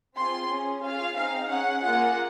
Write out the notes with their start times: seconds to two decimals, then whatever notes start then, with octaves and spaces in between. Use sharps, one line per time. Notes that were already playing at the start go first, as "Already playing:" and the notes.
0.16 C4 F4 G#4 C6
0.49 C#4 G#4
0.82 C#4 F4 G#4 F5
1.16 C4 D#4 G#4 F5
1.48 C#4 G#4 F#5
1.82 A#3 F4 G#4 F#5